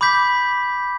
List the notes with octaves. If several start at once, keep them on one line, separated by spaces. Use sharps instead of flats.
B5 D6 G6 B6